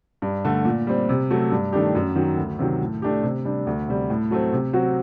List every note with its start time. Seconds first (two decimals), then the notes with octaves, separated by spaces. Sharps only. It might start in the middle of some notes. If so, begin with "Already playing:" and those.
0.22 G2
0.45 D3 A3
0.65 A#2
0.87 G3 C4
1.09 C3
1.31 F#3 A3
1.51 G2
1.73 D#3 A3 D4 G4
1.95 F#2
2.16 D#3 F#3
2.37 D2
2.59 C3 D#3 F#3
2.81 A2
3.02 A3 D4 G4
3.23 C3
3.45 G3 D4
3.67 D2
3.88 C3 G3
4.10 A2
4.31 F#3 A3 C4
4.53 C3
4.73 F#3 C4 F#4